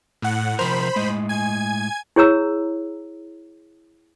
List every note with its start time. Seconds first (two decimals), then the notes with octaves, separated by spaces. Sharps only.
0.22 A2 F#5
0.59 C3 F3 A#4 C5 B5
0.96 A2 G#3 D#5
1.29 G#5 G#6
2.16 E4 G#4 C#5 A#5 E6